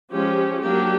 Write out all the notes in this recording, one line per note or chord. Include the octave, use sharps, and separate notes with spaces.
F3 G#3 C#4 G4
F#3 A#3 D4 G4